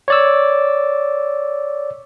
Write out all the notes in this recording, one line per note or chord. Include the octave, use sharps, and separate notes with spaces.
C#5 D5 E6